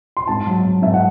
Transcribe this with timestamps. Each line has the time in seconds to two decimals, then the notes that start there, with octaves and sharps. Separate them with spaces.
0.17 C6
0.27 G#2 A5
0.47 F#3
0.65 F#3
0.82 G#2 E5
0.94 F#5